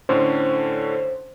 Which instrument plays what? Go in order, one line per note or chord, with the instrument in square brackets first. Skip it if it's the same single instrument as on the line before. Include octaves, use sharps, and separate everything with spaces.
[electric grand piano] A2 D3 C#4 [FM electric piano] C5